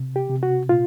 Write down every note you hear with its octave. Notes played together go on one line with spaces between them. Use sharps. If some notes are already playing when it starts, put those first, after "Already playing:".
Already playing: C3
G4
C3
F#4
A#2 F4